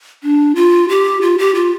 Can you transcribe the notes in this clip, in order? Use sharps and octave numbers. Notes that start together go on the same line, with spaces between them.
D4
F4
G4
F4
G4
F4